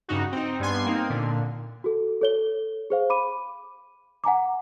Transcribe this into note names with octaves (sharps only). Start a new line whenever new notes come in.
G2 C#3 D#4 F#4
C4 D#4
G2 G3 B3 G#5 C6
A#3 C4 D#4
A#2 D3
F#4 A4
A4 C#5 G7
G#4 C5 F5
B5 D6 D#7
F#5 G#5 A#5 D6